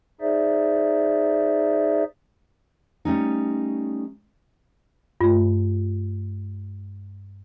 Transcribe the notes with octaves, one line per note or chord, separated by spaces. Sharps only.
D#4 G#4 C5 D5 E5
G3 A3 C#4 D#4
G2 A3 F4